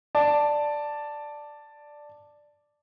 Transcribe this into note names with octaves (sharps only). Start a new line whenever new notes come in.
D5 A5